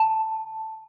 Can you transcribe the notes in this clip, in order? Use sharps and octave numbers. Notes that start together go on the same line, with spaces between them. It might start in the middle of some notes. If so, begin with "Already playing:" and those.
Already playing: A5